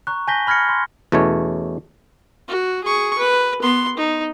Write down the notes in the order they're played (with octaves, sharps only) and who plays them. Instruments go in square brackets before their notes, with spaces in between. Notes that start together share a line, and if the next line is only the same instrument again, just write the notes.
[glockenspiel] A#5 C#6 F#6
G#5 A5 G6 A#6 B6 G7
B5 F6 G#6 A#6 C#7
C6
[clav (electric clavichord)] E2 B2 A3 C#4 C#5
[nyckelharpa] F#4
G#4 C#6
B4
B3 C6
D#4